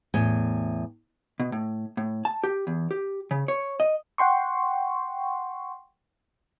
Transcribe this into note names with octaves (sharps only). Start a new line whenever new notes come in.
E2 A2 G#5
B2
A2
A2
A5
G4
E2
G4
C#3
C#5
D#5
F#5 G5 C6 C#6